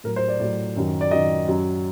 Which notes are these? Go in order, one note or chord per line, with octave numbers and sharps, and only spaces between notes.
A2 F#3 A#4
C5
D5
A2 F#3 D5
F#2 D#3 F#3
D5
F#2 D#3 F#3 D#5
F#2 F#3